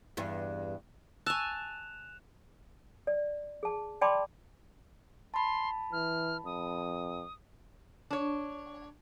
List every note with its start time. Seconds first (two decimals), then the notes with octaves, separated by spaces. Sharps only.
0.17 E2 G2
1.26 G#5 A5 C#6 E6 F#6 E7 F7
3.07 D5
3.63 G#4 A5
4.01 D5 G5 A5 B5 C6 D6
5.34 A5 B5 C6
5.93 E3 F6
6.46 F2 D#6
8.11 D4 C#5